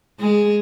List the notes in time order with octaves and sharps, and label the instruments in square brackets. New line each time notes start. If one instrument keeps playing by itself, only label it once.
[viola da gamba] G#3 G#4